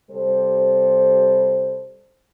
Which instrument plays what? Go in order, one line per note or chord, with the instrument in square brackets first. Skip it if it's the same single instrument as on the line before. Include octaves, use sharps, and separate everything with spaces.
[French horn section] C3 G3 A4 C5